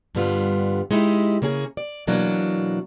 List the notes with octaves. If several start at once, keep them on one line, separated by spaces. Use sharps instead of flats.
G2 D3 G3 B3 F4
G#3 D#4 E4 F#4 G4
C#3 A#3 C#4 G#4
D5
B2 E3 F#3 A#3 D4